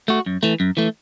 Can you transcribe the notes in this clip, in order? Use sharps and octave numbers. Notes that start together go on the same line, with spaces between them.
A3 F#4
F#2
E3 A3
F#2
E3 A3